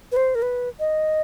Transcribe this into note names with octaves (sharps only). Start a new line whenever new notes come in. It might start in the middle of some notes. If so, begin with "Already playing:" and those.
B4
C5
A#4
B4
D#5